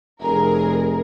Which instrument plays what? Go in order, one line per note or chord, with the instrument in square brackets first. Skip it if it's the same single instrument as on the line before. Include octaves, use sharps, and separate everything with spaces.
[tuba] F1 [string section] G#4 A#4